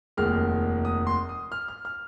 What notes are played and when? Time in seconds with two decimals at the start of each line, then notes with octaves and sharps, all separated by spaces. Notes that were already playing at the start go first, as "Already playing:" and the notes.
0.17 F1 D#2 D#3 G#3 F6
0.85 D#6
1.07 C6
1.29 D#6
1.52 F6
1.68 F6
1.85 F6